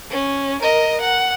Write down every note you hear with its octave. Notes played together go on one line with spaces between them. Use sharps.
C#4
A#4 D#5
F#5